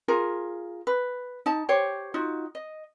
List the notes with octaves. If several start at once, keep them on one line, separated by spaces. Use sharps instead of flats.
F4 G#4 A#4
B4
D#4 A5
G4 C5 C#5
D#4 F4 F#4
D#5